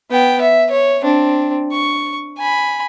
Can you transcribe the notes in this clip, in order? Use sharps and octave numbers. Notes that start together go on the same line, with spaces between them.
B3 G5
E5
C#5
C4 D4
C#6
G#5 B5